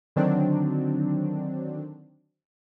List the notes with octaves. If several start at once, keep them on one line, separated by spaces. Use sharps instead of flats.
D3 D#3 F#3 C4 D4